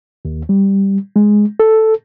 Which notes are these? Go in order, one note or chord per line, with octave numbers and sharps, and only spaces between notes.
D#2
G3
G#3
A4